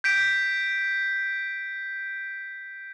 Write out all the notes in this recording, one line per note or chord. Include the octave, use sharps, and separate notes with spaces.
G6 B6 D7